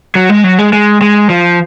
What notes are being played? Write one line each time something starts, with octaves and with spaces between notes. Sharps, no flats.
F#3
G#3
F#3
G#3
G#3
G#3
F3